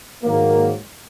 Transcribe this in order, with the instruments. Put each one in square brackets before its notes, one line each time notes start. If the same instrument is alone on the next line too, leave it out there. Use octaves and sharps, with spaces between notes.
[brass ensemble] G#2 D#3 F#3 A#3